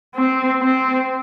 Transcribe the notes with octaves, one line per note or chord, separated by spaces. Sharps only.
C4
C4